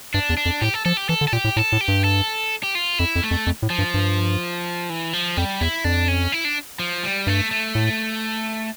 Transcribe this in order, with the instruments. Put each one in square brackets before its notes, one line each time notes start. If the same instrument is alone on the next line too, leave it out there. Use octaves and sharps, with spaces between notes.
[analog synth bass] G2 [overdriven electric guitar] D4
[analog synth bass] E2
[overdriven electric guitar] D4
[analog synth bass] F2
[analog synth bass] A2 [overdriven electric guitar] G4
[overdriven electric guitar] A4
[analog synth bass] F3 [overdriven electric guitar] A4
[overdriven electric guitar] G4
[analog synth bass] E3 [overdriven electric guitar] A4
[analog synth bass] D3
[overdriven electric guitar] A4
[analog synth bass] A#2 [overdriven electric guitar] G4
[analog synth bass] A2
[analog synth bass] A2 [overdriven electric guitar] A4
[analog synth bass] A2
[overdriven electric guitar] G4
[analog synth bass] G2
[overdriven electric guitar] A4
G4
F4
[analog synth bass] F2 [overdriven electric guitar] E4
[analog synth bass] F2
[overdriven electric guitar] A3
[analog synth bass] F2
F2
A2
[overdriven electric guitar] F3
[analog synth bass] G2
G2
[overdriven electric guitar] E3
F3
[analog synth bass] F2 [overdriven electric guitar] G3
[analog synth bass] E2 [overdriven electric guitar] E4
[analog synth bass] F2 [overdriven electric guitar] D4
[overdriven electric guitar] C#4
E4
D4
F3
G3
[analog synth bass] G2 [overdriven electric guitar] A3
[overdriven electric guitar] A3
[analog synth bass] A2